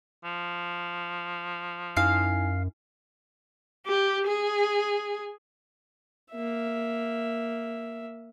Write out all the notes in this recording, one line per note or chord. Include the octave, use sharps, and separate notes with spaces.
F3
F#2 D#4 E4 F5 G#5
G4
G#4
A#3 E5